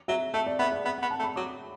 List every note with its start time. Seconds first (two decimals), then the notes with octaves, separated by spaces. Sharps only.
0.08 F#3 E5
0.34 A3 E5
0.47 D5
0.59 B3 E5
0.72 D5
0.85 B3 E5
0.98 F#5
1.02 B3
1.11 A5
1.20 A3
1.24 B5
1.36 F#3 D6